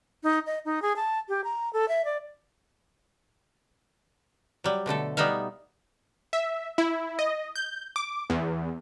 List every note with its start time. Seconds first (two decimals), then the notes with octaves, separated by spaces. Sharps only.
0.24 D#4
0.46 D#5
0.65 D#4
0.82 G#4
0.96 A5
1.29 G4
1.44 A#5
1.73 A4
1.88 E5
2.05 D5
4.64 F#3 G3
4.86 B2 D3 A3 A4
5.17 G3 B3 D#4 E5 F5
6.33 E5
6.78 E4
7.19 D#5
7.56 G6
7.96 D6
8.30 E2